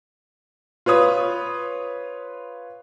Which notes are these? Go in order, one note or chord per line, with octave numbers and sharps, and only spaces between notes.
F4 B4 C#5 D#6